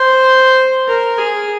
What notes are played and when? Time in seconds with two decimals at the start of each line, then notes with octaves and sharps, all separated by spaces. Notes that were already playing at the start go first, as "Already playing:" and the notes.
Already playing: C5
0.88 A#4
1.18 G#4